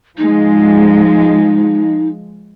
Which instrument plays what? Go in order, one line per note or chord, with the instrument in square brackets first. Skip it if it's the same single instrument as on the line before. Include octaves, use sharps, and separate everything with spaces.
[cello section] F3 G#3 [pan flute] D#4